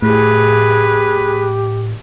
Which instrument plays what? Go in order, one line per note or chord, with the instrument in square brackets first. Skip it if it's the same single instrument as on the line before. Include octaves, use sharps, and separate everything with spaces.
[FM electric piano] A2 [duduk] G4 [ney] G#4 [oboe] B4